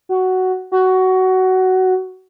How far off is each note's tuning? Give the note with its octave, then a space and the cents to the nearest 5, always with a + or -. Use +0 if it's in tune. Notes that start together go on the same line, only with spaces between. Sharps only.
F#4 +10
F#4 +15